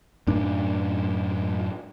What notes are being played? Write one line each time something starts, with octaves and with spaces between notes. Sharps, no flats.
F#2 A2 D4